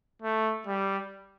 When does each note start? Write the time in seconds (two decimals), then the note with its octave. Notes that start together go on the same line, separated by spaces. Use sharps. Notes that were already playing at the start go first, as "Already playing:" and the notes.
0.22 A3
0.67 G3